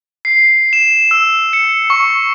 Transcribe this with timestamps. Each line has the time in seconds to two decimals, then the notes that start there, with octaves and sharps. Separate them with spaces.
0.25 C7
0.73 E7
1.11 E6
1.53 C#7
1.90 C#6